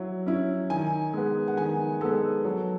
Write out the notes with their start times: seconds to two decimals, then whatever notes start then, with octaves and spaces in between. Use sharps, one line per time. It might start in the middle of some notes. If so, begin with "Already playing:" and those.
Already playing: F#3 E4
0.26 C#4 E4
0.70 D#3 G#5
1.14 G#3 B3
1.48 F#5
1.57 D#3 G#5
2.01 G#3 B3 A4
2.44 F#3